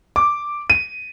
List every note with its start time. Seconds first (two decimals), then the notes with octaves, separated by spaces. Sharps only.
0.16 D6
0.70 D#7